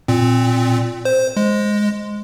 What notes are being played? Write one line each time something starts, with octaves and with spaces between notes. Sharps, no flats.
A#2 C4
C5
G#3